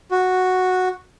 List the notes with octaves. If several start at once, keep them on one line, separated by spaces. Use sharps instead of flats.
F#4